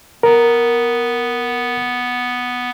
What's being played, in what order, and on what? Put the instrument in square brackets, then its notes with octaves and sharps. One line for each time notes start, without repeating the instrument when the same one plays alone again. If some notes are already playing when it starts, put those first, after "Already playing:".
[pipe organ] B3 [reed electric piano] A#4